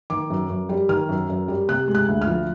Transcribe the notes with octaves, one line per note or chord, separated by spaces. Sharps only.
D#3 D6
F#2
F#2
G3
D#3 F6
F#2
F#2
G3
C3 F#6
G#3
F#6
D2
F6
F3